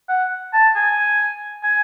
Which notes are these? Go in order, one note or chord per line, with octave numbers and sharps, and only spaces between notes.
F#5
A5
G#5
G#5